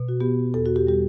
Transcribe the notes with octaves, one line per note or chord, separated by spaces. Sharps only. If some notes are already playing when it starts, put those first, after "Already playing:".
Already playing: B2
F#4
B3 G4
E2 A4
F#4
G4
G3 G4